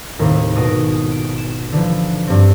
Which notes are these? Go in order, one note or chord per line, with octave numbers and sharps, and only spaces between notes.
D#2 A2 C3
G#1 B2 D#6 A#6 D7 D#7
D7
E7
D3 E3 F3
G2 C4